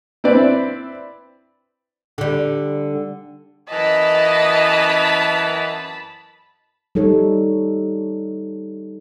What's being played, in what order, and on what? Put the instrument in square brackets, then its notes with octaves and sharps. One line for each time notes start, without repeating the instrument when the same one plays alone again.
[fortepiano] C4 E4 B4 D5 E5
[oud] D3 G3
[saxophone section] F#2 E3 [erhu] D#5 [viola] A5 B5
[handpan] G3 D#4 A4 C#5